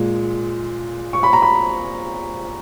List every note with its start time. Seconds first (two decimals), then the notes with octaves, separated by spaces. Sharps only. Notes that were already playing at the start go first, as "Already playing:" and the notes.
Already playing: A#2 G#3
1.13 C#6
1.23 B5
1.33 A#5
1.42 B5